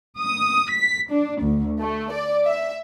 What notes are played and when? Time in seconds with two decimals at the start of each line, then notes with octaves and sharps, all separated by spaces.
0.19 D#6
0.72 B6
1.10 D4
1.43 D2
1.81 A3
2.11 D5
2.46 E5